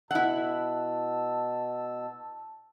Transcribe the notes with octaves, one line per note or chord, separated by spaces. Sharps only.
B2 E4 F#5 A5 E6